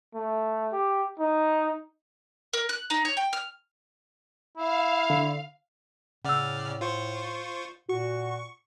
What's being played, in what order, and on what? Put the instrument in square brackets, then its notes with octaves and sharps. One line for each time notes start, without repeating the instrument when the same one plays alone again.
[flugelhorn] A3
G4
D#4
[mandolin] A#4
F#6
D#4
C#5
G5
F6
[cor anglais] E4 [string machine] F5
[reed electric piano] D3
[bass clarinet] A2 [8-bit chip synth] C#3 D5 F6 [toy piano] F#5 E6
[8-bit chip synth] F4 C5 C#6
[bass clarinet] A#2 [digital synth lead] F#4 [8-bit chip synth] C#6